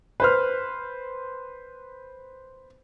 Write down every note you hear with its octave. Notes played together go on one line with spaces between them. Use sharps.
B4 C5 F6